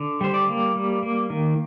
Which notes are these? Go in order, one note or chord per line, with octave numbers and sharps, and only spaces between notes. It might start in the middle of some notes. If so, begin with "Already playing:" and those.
Already playing: D3
G3 C5
D5
A#3
G3
A#3
D#3